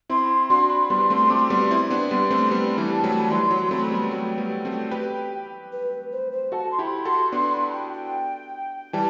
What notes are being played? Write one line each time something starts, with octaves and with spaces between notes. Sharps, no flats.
C4 E4 C6
B5
C6
D4 F#4 C6
B5
G3 B3 C6
A3 C4 C6
A3 C4 D6
G3 B3 C6
C4 E4
B3 D4
G3 B3 C6
A3 C4
G3 B3 B5
E3 G3
A5
F#3 A3
A5
B5
E3 G3 C6
F#3
A3 C4 B5
G3 B3
F#3 A3 G5
G3 B3
A3 C4
G4 B4
B4
C5
C5
F#4 A4 A5
C6
E4 G4 B5
F#4 A4 C6
B3 D4 C6
B5
G5
G5
E3 G3 A5